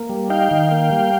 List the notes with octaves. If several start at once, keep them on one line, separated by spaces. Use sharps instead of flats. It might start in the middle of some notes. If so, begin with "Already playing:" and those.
Already playing: A#3
G3
D#4 F5 G5
D#3
A#3
G3